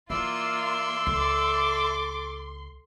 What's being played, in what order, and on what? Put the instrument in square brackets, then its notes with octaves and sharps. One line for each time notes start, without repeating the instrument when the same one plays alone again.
[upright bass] E3 [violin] A#3 F4 [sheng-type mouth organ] D5 E5 E6 [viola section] C6
[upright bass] C#2 [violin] A4 D6